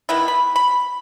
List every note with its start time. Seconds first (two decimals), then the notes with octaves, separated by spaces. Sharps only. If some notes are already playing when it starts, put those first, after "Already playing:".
0.09 D#3 B3 E4
0.28 B5
0.56 B5